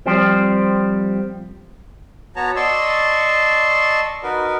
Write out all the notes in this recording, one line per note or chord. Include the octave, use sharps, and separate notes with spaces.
F3 G3 C4
B3 F#4 C#5 A5 A#5
D5 D#5 A5 C6 C#6 E6
D#4 F#4 A#4 B4